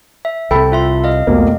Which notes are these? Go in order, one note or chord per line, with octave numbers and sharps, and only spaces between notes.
E5
C2 C3 A4 G5 B5
F4 E5 C6
D#5 F5
F1 C2 B2 A#3